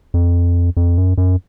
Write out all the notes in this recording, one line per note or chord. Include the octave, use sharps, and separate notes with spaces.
F2
F2
F#2
F#2